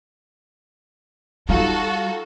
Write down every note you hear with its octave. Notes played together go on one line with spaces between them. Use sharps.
G3 D#4 F4 F#4 A4